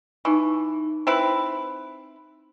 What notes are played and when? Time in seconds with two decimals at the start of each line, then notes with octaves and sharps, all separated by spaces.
0.25 E3 D#4 A5 C#6
1.07 C4 E4 B4